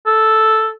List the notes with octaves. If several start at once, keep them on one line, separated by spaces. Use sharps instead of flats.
A4